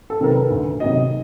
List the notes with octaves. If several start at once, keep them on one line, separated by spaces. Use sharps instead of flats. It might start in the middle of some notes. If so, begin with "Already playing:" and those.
A4
C3 D#3 F#3 A#4
B4
D2
C3 D#3 F#3 D#5